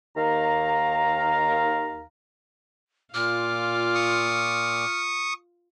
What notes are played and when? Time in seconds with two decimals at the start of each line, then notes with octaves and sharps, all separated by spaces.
0.16 D#2 D#3 F5 A#5
3.14 A#2 F4 D6 F6
3.95 C#6 D#6